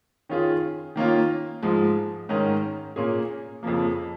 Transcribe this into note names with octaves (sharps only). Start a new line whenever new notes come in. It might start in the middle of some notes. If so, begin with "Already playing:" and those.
D#3 C#4 F4 G#4
D#3 A#3 C#4 F4
G#2 F3 G#3
G#2 D#3 C#4 A#4
A#2 A#3 C#4 G#4
F2 C#3 F3 A#3